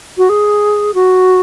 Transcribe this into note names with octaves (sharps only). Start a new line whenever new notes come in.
F#4
G#4
F#4